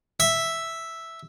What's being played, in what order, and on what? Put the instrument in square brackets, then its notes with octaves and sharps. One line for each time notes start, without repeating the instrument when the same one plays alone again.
[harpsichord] E5